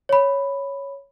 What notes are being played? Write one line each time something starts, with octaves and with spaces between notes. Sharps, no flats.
C#5 B5